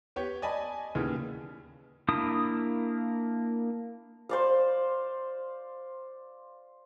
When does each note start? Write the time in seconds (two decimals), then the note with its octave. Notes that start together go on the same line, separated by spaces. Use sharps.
0.16 B3 G4 C#5
0.42 D5 D#5 G#5 A5 B5
0.95 D#2 C#3 E3 B3
2.08 A#3 D4 E4 D#6
4.29 C5 D5 F5